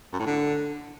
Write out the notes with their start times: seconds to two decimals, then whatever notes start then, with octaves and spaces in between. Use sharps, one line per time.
0.13 F#2
0.20 A2
0.26 D3